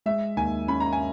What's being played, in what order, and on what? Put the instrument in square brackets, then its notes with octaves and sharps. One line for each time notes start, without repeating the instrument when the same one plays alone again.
[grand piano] G#3 [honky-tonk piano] E5
[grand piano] D#2 [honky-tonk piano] G#5
[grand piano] C#4 [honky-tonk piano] B5
[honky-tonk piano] A#5
G#5